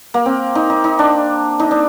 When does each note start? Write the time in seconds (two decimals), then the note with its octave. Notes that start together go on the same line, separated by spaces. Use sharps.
0.14 A#3
0.26 C4
0.55 D#4
0.70 D#4
0.84 D#4
0.99 D4
1.60 D#4
1.71 D4